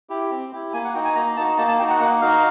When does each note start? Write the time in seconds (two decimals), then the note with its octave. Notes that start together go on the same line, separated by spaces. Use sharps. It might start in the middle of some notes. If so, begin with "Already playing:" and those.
0.10 E4 G4
0.31 C4
0.52 E4 G4
0.73 A#3 G#5
0.84 F#5
0.94 D#4 F#4 G5
1.05 G#5
1.15 A#3 A#5
1.37 D#4 F#4 A5
1.58 A#3 A5
1.68 A5
1.79 D#4 F#4 G5
1.90 F#5
2.00 A#3 F#5
2.21 D#4 F#4 F5